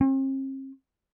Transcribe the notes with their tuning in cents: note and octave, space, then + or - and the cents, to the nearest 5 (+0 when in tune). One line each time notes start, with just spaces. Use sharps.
C4 +45